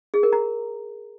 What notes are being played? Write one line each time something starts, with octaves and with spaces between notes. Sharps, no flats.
G#4
A#4
A#5